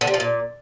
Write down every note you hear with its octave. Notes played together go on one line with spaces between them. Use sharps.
D3
C3
F3
A#2